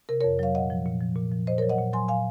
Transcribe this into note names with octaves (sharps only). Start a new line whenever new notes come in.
C3 A#4
A#4 C#5
F2
F#3 C#5 F5
A#2 D#5 F#5
F3
A#2
F3
A#2
F3
A#2 C5 D#5
A#4 C#5
F#3
D#5 F#5
A#2
F#3 G#5 C6
A#2 F5 G#5